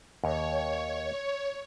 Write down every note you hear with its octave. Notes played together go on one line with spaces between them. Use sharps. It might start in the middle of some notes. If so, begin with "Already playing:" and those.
D#2 C#5